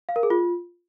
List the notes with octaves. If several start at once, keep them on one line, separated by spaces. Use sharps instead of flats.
F5
A#4
G#4
F4